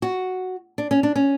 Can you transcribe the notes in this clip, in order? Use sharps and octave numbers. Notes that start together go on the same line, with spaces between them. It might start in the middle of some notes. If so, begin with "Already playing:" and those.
F#4
D4
C#4
D4
C#4